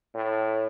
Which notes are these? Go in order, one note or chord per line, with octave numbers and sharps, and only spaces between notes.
A2